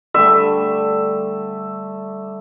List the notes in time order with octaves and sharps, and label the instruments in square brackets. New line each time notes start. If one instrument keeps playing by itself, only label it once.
[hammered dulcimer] D3 G3 A3 [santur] E5